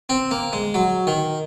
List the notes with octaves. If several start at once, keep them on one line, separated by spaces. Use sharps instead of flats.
C4
A#3
G#3
F#3
D#3